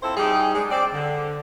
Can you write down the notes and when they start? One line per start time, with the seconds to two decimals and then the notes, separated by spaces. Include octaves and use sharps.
0.02 F2 F3 E4 A4 C5
0.17 G3 D#4 G4 G#4
0.55 G#3 D4 G#4
0.70 C4 C5 D5
0.93 D3